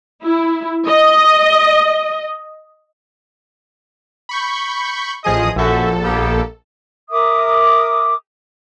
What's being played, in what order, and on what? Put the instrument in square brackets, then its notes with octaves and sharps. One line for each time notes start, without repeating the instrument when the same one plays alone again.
[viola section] E4
D#5
[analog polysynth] B5 C#6 G6
[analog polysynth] A1 F3 D#6 [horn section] G#4 D#5
[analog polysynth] A#1 A4 [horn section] F#2 F#4 E5
[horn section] G3 A#3 B3
[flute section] A#4 E5 D6 D#6